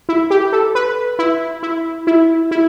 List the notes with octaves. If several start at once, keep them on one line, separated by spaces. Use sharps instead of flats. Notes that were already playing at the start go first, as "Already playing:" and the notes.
E4
G4
A4
B4
E4
E4
E4
E4